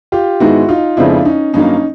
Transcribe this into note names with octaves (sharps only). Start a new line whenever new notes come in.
F4 G4
G#2 D#3 G#3 B3 E4 F#4
D#4 F4
F2 C#3 F3 G#3 B3 D4 E4
C#4 D#4
G2 D#3 F#3 A#3 C#4 D#4